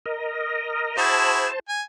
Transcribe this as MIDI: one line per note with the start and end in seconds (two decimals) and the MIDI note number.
0.06 0.97 70
0.06 0.97 75
0.98 1.47 64
0.98 1.47 66
0.98 1.47 68
0.98 1.59 72
0.98 1.59 81
1.68 1.82 80